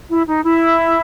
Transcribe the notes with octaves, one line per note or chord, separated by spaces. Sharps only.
E4
D#4
E4